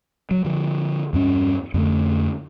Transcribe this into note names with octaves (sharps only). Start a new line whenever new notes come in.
F#3
D3 F3
E2 G2 C#4
F2 D3 A3